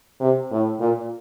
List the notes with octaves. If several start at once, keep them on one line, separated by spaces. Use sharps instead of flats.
C3
A2
A#2